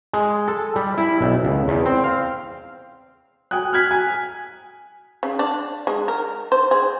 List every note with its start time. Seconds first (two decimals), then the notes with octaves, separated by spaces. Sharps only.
0.13 G#3
0.48 A4
0.76 G3
0.98 E4
1.21 B1
1.43 C#2
1.68 E2
1.85 C4
2.04 F5
3.51 G5 G#5 D#6 F#6
3.73 F6 F#6 G#6 B6
3.91 G#5
5.23 C#3
5.39 D4
5.87 G#3
6.08 A#4
6.52 C5
6.71 G#4